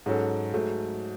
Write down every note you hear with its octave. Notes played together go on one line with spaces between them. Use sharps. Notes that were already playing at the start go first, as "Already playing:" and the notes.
G#2 F#3 C#4 F#4 A4
G#2 F#3 A3